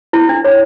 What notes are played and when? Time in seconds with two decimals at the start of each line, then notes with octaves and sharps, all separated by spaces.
0.13 E4
0.29 D4
0.44 C#5